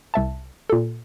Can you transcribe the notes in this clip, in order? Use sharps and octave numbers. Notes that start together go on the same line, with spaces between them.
C2 E5 A5
A#2 A4